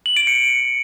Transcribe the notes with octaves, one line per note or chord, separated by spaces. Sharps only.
F#7
D7
C#7